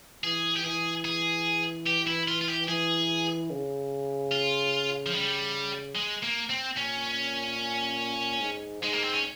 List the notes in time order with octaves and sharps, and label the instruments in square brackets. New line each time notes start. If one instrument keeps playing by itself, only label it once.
[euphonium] E3 [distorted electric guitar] G#4
[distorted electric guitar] G4
[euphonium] E3 [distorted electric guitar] G#4
[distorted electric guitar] G#4
G4
E4
F4
F4
G4
[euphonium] E3 [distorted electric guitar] G#4
[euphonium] C#3
[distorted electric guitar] F4
F3
[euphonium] C#3 [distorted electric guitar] G3
[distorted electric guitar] G#3
A#3
C4
[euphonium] A#2 [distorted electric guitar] C#4
[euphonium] G#2
[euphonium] G#2 [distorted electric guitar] G#3
[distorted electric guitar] A#3
C4
C#4